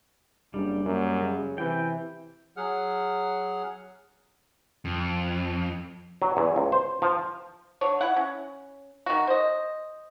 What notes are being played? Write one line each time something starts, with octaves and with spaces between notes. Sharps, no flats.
F#1 G3 D4
F#2 A#3
C#3
C3 E3 G5
F#3 G#4 F#5 F6
F2
F#3
E2
C#2
C5
F3
D3 C#5
E4 F#5
C#4
D#3 F#4
C5 D#5